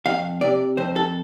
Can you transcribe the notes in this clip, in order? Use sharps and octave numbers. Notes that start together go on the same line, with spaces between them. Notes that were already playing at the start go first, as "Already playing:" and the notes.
F2 F5
C3 D5
F2 C5
A4